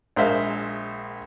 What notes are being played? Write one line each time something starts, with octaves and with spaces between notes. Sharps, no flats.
A#1 G#3 A#4 C5 E5 F5